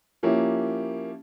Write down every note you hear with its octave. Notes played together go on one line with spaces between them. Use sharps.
F3 A#3 C#4 E4 G4